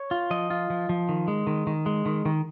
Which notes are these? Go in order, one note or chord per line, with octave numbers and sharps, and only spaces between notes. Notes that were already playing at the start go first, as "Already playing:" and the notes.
Already playing: C#5
F4
F3 D#5
F4
F3
F3
D#3
G#3
D#3
D#3
G#3
D#3
D#3